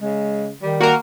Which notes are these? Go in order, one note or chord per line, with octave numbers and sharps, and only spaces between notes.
C#3 G#3
D#3 G3
A#3 F#4 A#4